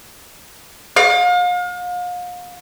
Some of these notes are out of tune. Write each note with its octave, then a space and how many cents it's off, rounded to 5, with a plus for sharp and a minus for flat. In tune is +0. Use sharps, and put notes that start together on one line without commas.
F5 +40